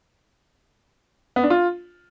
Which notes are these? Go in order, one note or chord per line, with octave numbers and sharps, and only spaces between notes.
B3
D4
F4